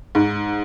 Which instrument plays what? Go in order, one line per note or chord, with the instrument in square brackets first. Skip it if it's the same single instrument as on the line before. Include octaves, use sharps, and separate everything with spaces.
[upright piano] G#2